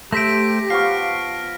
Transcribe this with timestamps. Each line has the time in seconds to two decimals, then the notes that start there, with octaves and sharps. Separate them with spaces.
0.13 A3 G4 C5 E5 A#6 B6 D7
0.70 F3 B3 F5 C#6 F6